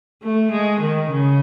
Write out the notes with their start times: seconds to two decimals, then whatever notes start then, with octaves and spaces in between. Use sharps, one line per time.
0.23 A3
0.52 G#3
0.81 D#3
1.11 C#3